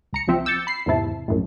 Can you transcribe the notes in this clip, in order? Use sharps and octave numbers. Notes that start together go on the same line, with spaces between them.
C#2 A#5 C#7
C#2 F3 C4 E5 G5
D6 E6 G6 A6 C#7
B5 C7
E2 G#2 C3 E4 A5
A#1 F#2 A2